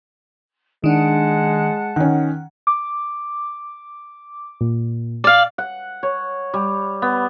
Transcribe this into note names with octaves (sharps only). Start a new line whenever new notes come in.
D#3 G#3 D4 F#5 A5 F#6
D#3 C#4 F#5
D6
A#2
D5 F5
F#5
C#5
G3
B3